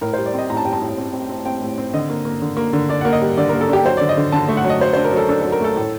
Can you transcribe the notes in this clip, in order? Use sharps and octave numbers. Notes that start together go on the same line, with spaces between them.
A2 A#4
G3 C5
D5
C4 D#5
A2 A#5
A5
G3 G5
A5
A2
C4
C4
C4
C4 G5
A2
C4
D3 D#5
A#3
A#3
D3
A#3
D3
D4 D5
A#3 F#5
D#5
G3
D3 D5
A#3 A#4
A4
D4 G4
F#3 C5
D3 D5
D#5
D3
D3 A5
A3
F#5
F#3 D#5
F#3 C5
D4 C5
A#4
F#3 A4
D4 A4
F#3 A4
A#4
A3 A4
A2